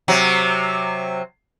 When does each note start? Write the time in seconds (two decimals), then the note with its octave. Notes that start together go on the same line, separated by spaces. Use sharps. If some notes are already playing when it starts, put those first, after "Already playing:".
0.08 C3 F#3